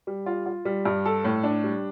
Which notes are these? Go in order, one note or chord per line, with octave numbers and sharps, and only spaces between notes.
G3
F4
F4
G3
G2
A4
A2
D4
G3